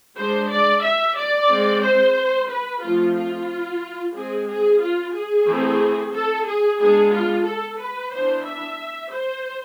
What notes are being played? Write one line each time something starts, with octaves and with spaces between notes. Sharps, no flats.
G#3 D4 C5
D5
E5
D5
G#3 C4
C5
B4
F3 A3 C4 F4
F4
G#3 C4 G#4
G#4
F4
G#4
E3 A3 C4
A4
G#4
G#3 B3 D4 G#4
F4
A4
B4
E3 B3 D4 C5
E5
C5